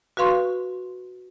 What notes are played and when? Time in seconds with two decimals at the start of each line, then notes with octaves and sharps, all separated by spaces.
0.17 F#4 B4 F5 C6 C#6